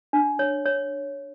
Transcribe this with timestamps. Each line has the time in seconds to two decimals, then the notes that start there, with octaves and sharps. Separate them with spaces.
0.13 D4
0.39 C#5
0.66 C#5